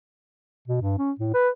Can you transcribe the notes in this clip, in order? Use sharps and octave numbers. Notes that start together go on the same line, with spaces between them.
B2
G2
C#4
A2
B4